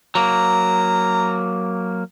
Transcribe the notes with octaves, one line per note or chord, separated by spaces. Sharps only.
F#3 A#3 A#5